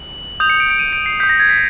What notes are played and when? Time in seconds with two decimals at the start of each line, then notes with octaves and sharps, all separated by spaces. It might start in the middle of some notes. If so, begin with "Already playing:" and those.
Already playing: F#7
0.40 D#6 G6 F7
0.50 C#7
0.60 D7
0.70 D7
0.79 D#7
0.93 D7
1.06 C7
1.20 D#6 G6 B6
1.29 A#6
1.40 G#6
1.50 B6